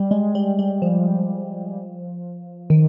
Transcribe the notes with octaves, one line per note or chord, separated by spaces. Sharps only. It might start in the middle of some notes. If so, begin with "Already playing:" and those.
Already playing: G3
G#3
G3
G3
F3
D#3